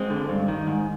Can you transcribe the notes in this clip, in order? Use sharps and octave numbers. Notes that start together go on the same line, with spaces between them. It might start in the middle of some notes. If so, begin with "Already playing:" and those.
Already playing: G#3 C4
D3
G2
D#3
G#2